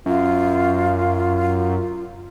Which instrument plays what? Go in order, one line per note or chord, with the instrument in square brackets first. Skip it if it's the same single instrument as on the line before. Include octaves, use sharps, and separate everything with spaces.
[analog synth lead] F#2 [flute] F4